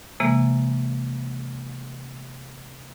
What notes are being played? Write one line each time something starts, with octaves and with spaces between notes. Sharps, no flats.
C3 E3 G#3 A#3